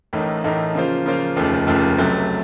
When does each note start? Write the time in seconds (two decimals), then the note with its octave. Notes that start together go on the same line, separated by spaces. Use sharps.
0.13 A1 A2 A3 D#4 A#4
0.44 A1 A2 A3 D#4 A#4
0.75 C#3 F3 A#3 F4 C5
1.06 C#3 F3 A#3 F4 C5
1.36 F1 D#2 C#3 F3 A3
1.67 F1 D#2 C#3 F3 A3
1.98 C#2 C3 F#3 A3